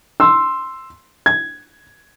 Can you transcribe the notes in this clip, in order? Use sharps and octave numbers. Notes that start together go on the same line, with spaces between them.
C6 E6
G#6